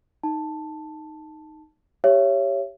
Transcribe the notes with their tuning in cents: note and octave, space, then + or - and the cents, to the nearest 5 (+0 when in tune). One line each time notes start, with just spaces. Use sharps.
D#4 +0 A5 +0
G4 +0 C#5 +0 E5 +35